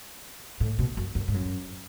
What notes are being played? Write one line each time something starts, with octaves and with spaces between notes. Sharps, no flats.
A2
B2
F#2
F#2
G#2
F#2